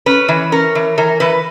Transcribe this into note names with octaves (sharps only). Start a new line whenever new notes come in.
C#4 B4
E3
C#4 A#4
E3
E3 A#4
E3 B4